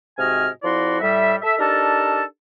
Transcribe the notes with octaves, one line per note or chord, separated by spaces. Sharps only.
G#2 C3 F#4 D#5 G#5 F6
F2 F3 E4 F#4 D5 C6
A2 G3 E5
A4 E5
D4 D#4 G4 A4 A#4 A5